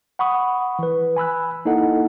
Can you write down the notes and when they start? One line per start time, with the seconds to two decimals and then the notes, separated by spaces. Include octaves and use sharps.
0.19 F#5 B5 C#6 D#6
0.79 E3 B4
1.16 G#5 B5 E6 F#6
1.65 A#3 D#4 E4 A4 D#5 F#5